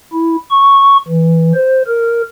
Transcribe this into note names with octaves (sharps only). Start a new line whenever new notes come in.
E4
C#6
E3
C5
A#4